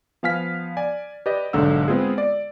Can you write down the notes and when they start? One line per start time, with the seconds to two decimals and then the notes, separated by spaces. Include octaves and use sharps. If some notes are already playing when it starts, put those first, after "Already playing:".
0.23 F3 B3 F5 G#5 F6 B6
0.77 D5 G#5
1.26 G4 B4 D5 D#5
1.53 B1 G#2 D3 D#4 F#5 E6
1.88 G#3 B3 C4 F4 G#4
2.18 D5